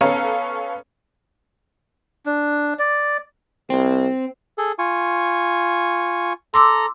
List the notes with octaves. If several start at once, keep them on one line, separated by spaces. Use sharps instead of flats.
B3 C#4 A4 C#5 F5 A#5
D4
D5
C2 C4
G#4 A4
F4 G#5 C#6
A4 A#5 C6 D6 E6